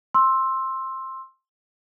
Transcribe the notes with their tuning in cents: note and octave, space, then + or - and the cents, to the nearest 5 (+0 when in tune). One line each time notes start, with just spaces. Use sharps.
C6 +15 E6 +0